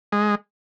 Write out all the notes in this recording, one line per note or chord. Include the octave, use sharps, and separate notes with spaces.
G#3